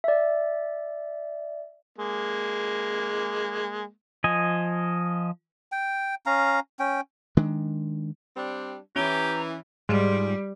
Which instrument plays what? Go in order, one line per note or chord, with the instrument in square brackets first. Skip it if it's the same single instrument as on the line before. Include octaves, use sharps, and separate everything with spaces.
[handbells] D5 E5
[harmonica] G#3 A#3
[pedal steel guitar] F3 D#5 G#5
[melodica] G5
C#4 F5 A#5
C#4 G5
[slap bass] D#3 G#3 D4
[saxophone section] G3 C4 D4
[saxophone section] E3 [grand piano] C#4 D7 G7 [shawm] G4 [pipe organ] A#5
[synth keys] G#2 G#3 F4 [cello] G3